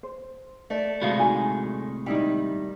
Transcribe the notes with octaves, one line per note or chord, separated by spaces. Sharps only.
C5
A3 D5 E5
A2 C3 G#3 F#4 C5 F5
D#4 F#4 G#5
D#3 G3 D#4 E4 G5